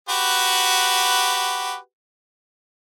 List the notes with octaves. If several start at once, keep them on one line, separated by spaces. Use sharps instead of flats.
F#4 G4 B4